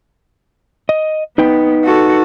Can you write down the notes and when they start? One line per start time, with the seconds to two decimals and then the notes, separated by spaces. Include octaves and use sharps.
0.89 D#5
1.38 B3 D#4 B4 G5
1.84 F#4 A4